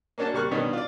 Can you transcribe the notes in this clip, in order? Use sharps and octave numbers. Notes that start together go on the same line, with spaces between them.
A#3 C#4 D4 F#4 A5
C2 G3 A#3 C#6 F6 F#6
G2 B2 D#3 B3 C#4 D4
F4 D5